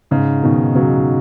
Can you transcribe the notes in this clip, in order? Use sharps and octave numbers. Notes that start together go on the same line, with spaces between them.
G#2 C#3
B2 D#3
C#3 F#3